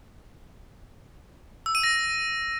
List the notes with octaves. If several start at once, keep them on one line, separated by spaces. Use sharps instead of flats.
E6
D#7
A#6